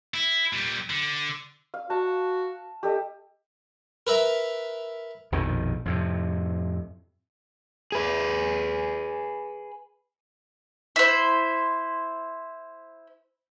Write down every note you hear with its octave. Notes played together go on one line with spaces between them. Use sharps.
E4
A#2 G3
D3
F5
F#4 A5
G4 A4 D#5
A#4 B4 E5 A#5
A#1 F2 B2 D#3
F2 A2 C3
G#4 B4
E4 C5